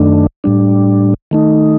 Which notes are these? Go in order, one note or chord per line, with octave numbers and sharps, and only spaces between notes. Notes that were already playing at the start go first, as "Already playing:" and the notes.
Already playing: F#2 D#3 A3 D4
A2 G3 D4
D#3 A3 D#4